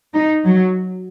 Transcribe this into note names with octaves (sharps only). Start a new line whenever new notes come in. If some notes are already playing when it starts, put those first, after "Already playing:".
D#4
F#3